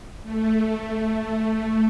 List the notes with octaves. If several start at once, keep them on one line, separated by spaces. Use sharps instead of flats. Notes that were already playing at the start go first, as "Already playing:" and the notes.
A3